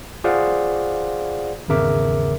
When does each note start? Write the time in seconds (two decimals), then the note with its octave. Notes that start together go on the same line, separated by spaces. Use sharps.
0.24 F4 G#4 C5 D5 F5 F#5
1.68 G#1 E2 C#3 A#4 E5 D6